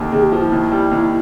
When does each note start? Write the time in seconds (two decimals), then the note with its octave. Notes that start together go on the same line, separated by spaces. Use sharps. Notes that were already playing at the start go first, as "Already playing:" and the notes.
Already playing: D#2 D3
0.11 D#2 G#4
0.22 G4
0.32 F3 F#4
0.42 E4
0.52 D#2
0.72 G3
0.91 D#2